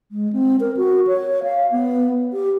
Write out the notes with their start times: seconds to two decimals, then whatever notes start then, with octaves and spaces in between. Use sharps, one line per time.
0.12 G#3
0.33 C4
0.60 A#4
0.77 F#4
1.07 C#5
1.43 F5
1.71 B3
2.33 G4